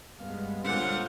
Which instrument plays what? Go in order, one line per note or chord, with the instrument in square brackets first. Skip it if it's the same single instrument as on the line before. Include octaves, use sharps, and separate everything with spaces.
[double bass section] G2 G#3 B3 [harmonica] F5
[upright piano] A#2 D3 [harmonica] F#3 C4 F4 [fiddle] F#5